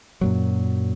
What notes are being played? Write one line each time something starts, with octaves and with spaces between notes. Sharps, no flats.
F#2 A#2 F#3